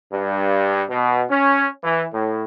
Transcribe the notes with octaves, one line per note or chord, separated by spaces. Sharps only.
G2
B2
C#4
E3
A2